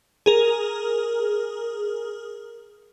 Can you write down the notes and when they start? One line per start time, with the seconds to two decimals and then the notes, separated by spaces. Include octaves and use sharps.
0.26 G#4 A#4